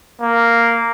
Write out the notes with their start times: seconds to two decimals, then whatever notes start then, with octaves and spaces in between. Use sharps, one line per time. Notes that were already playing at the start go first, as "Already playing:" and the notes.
0.21 A#3